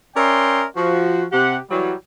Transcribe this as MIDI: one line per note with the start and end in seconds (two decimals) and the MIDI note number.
0.16 0.64 61
0.16 0.64 70
0.16 0.64 74
0.16 0.64 76
0.16 0.64 79
0.16 0.64 84
0.76 1.25 53
0.76 1.25 66
1.33 1.58 48
1.33 1.58 67
1.33 1.58 78
1.70 1.94 52
1.70 1.94 54
1.70 1.94 55